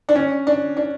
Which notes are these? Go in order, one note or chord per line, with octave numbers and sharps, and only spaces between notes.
D4
C#4
D4
D4